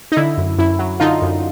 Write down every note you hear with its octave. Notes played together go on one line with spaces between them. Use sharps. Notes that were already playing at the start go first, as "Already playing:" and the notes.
D#4
D3 E4
F#2
F#2 E4
F#3
D3 D#4 F4
F#2